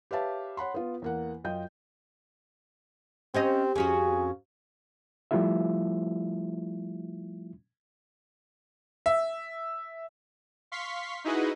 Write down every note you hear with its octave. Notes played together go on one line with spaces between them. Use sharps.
G4 B4 C#5 E5 F5 A5
C#5 F#5 B5 C6
B3 F4
E2 A#3 F#5
F#2 F4 D#5 G5 G6
C4 C#4 G4 C5 D#5
F2 C#4 F#4 G#4
F3 G3 A3 E4 F4 E5
E5
F5 C6 C#6 B6
D#4 E4 F#4 G#4 B4 D#5